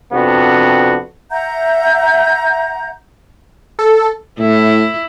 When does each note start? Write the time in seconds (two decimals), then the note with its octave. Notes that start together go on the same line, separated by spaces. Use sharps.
0.13 F2 C3 B3 D4 F#4
1.29 E5 F#5 A#5 G6
3.79 A4
4.39 A2 E4